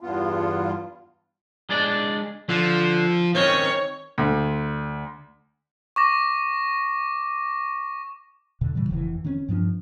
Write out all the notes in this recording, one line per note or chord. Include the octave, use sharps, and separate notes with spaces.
E2 G2 B3 F4
G#3 D4 D5
D3 F3
D#3 C4 C#4 C#5
D2
C#6 D6 A#6
E2 B2 D3
A2 C#3 E3 G3
F1 F2 D#3 E3
D#3 C4 C#4
G2 F3 A#3 D4